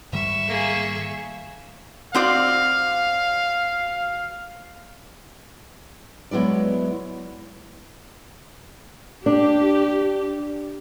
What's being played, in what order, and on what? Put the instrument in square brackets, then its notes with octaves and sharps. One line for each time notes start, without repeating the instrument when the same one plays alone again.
[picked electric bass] G#2 D#3 G3 [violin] E5 C#6
[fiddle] A#3 G#4
[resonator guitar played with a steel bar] C4 F#4 D5 [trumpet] F5
[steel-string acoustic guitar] F#3 G#3 B3 E4 D5
[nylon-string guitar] D4 [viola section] G4